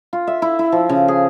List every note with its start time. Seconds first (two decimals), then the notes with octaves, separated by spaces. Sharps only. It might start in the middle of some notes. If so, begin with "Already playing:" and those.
0.13 F4
0.27 E5
0.42 E4
0.59 E4
0.72 F3
0.89 C#3
1.08 G#4